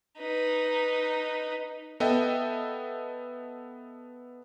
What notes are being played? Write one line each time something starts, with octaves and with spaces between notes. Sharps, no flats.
D#4 B4
B3 A4 D#5 E5 G5